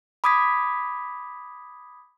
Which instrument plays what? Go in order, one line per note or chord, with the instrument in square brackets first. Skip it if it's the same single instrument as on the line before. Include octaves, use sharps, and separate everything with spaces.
[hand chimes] B5 D6 D#6 G#6 B6